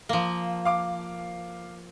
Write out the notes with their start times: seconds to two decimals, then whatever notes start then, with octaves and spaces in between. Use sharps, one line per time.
0.09 F3 A#3
0.65 F5 D6